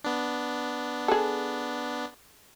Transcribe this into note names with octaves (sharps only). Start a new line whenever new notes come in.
B3 D4
G#4 A4